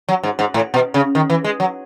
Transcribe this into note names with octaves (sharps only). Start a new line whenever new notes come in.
F#3
G#2
G#2
A2
B2
C#3
D#3
E3
G#3
F#3